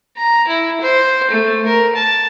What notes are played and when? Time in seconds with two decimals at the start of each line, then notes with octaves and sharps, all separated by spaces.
0.17 A#5
0.48 E4
0.81 C5
1.31 A3
1.66 A#4
1.95 A5